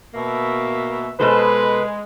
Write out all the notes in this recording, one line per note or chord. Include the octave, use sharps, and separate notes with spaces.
B2 A#3 E5
B2 G#3 A4 B4 C5